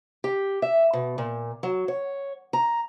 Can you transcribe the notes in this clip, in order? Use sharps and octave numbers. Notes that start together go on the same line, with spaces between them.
G4
E5
B2
A#2
F#3
C#5
A#5